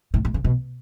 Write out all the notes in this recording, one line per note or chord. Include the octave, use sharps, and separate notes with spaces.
A2
A2
C#3
B2